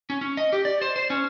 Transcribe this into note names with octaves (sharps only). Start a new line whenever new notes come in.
C#4
C#4
D#5
G4
D5
C5
C5
C#4